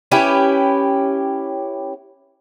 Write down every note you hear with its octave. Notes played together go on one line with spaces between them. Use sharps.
C#4 E4 G4 B4